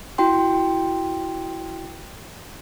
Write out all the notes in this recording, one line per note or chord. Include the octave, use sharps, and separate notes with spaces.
E4 F#4 G5 C6